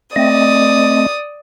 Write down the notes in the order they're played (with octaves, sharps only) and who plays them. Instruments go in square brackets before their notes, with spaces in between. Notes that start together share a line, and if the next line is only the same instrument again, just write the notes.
[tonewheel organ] A3 C4 D#5 [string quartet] D5 D#6